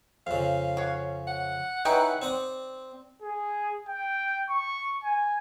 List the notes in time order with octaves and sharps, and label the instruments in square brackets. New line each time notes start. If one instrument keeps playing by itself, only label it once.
[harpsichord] F2 C#3 [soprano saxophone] F5
[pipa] F#4 C#5
[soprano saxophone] F#5
[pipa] D#4 C#5 G5 [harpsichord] E4 G#4 B4
[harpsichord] C4 D5 D#6
[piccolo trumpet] G#4
G5
C#6
G#5